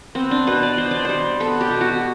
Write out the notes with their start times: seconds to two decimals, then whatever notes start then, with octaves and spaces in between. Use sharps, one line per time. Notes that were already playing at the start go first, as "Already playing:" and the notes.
0.15 B3 C4
0.31 D4
0.47 B2 B4
0.63 D5
0.77 B2 C5
0.91 D5
1.05 G3 C5
1.40 B3 A4
1.61 G4
1.71 B2
1.81 F#4